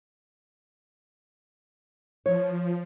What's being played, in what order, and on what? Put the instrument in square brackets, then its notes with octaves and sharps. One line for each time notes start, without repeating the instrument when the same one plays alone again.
[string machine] F3 [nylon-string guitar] C#5